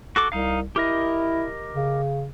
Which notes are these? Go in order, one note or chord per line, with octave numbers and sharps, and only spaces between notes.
F#4 A4 D6
C2 D#4 F5
E4 G4 A#4 D#5
C#3